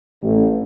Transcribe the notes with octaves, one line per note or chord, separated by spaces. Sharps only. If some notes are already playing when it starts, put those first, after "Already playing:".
A1